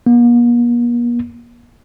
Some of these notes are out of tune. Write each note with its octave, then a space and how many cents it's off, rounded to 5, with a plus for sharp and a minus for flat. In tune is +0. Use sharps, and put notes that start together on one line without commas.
A#3 +45